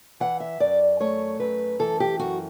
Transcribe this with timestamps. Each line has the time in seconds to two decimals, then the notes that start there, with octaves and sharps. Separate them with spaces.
0.20 E3 F#5
0.40 E5
0.60 F#2 D5
1.00 A3 C#5
1.40 F#2 B4
1.79 E3 A4
2.00 G4
2.19 F#2 F#4